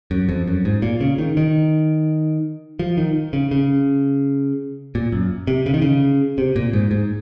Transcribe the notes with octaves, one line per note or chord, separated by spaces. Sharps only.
F#2
F2
F#2
G#2
A#2
C#3
D#3
D#3
F3
D#3
C#3
C#3
A#2
F#2
C3
C#3
D#3
C#3
C3
A#2
G#2
G#2